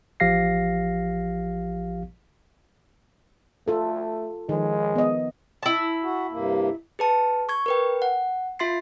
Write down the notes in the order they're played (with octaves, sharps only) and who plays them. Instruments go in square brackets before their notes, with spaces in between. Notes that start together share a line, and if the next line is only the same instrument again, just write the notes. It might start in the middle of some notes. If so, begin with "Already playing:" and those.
[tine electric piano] A1 F3 G4 F5 A#6 C7
[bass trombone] A3 [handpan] F4 A4
[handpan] D#3 F3 [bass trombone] G#3
[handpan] B3 D#5
[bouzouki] E4 A5
[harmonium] F#4
G2 C3 A#3
[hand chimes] G#4 B4 A5
C#6 G#6
A#4 B4 G5
F#5
F4 E5 C6 A6 C7